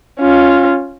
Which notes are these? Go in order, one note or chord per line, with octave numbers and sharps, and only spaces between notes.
C#4 F4